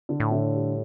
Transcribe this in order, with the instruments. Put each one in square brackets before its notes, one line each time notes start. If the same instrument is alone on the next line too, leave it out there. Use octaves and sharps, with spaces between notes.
[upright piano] D3
[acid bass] A2
[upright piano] D3
G3